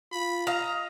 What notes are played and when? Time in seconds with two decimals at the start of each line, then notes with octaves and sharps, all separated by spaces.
0.12 F4 B5
0.47 D#5 F5 A#5